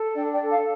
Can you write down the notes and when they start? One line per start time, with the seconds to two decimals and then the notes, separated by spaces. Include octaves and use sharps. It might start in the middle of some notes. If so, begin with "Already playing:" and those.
Already playing: A4
0.15 D4 D5 G5
0.32 D5 G5
0.41 A4
0.51 F5